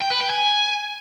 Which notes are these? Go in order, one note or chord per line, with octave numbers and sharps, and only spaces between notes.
G5
B4
G5
G#5